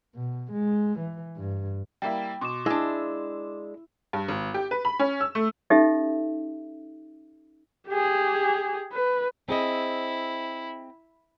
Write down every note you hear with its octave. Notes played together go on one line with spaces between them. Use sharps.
B2
G#3
E3
G2
G3 A#3 E4 G5
B2 C6 D6 E7
G#3 D4 E4 E6
G2
G#1
G4
B4
B5
C#4
E6
A3
C#4 D#4 G4 A4 D#5 E5
G4 G#4
B4
C4 E4 G#4 D#5